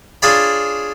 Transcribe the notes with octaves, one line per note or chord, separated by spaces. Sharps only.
D4 F4 G#4 C#5 D5 B5